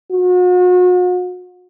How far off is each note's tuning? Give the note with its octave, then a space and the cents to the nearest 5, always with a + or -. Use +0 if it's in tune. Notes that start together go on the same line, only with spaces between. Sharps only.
F#4 -40